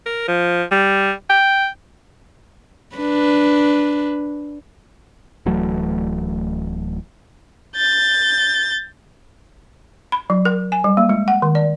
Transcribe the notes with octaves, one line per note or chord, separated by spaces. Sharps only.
A#4
F3
G3
G5
D4 B4
D1 E3 F#3 A3
G6 A6
B5
F#3
A#4
G#5
G3
A#3
G#3
F#5
D#3
D5